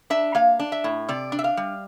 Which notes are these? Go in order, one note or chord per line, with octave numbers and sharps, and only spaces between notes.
D4 E5
A#3 F5
D4
E5
A2
C3 D5
D4
E5
F5
G3